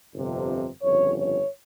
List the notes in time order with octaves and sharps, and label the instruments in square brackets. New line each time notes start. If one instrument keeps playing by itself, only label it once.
[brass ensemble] G1 F2 C3
G1 F2 C#3 C#5
C#5